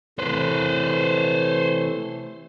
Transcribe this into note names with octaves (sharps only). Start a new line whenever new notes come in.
C3 E3 A3 B4 C5